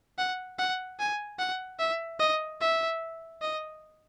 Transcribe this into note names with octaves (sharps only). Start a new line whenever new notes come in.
F#5
F#5
G#5
F#5
E5
D#5
E5
D#5